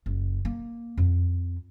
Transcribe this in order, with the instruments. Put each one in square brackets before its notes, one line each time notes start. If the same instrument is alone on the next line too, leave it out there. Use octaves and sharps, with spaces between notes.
[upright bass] F#1
A#3
F2